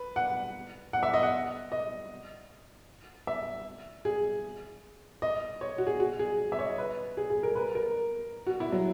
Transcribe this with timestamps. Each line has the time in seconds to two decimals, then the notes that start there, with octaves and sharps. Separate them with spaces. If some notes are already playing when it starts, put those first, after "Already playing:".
Already playing: B4
0.16 F#5
0.93 F#5
1.03 E5
1.14 D#5
1.23 F#5
1.72 D#5
3.27 E5
4.05 G#4
5.22 D#5
5.61 C#5
5.78 F#4
5.87 G#4
6.00 F#4
6.19 G#4
6.52 E5
6.59 C#5
6.65 D#5
6.78 B4
7.17 G#4
7.30 G#4
7.43 A#4
7.56 B4
7.75 A#4
8.47 F#4
8.60 E4
8.72 F#3